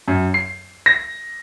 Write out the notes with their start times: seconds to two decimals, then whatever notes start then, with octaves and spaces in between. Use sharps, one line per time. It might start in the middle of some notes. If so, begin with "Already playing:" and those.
0.08 F#2
0.34 C7
0.86 A#6